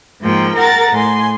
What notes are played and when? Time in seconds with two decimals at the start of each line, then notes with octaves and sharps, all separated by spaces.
0.21 G#2 F3 A#3 G5
0.56 A#4 F#5 A#5 A6
0.92 A2 G#5 C6